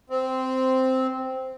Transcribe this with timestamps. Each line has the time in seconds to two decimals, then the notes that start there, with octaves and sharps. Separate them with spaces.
0.10 C4